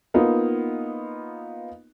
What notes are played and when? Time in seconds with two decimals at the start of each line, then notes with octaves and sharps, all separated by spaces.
0.14 A#3 B3 D#4 F4